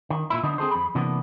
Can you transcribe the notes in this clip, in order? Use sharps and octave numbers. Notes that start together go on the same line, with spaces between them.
D#3
A#2 E4
D3 B3 D4 D#4
C4 G#4 A4 C5
F2 B5
C3 E3 A#3 B3 D4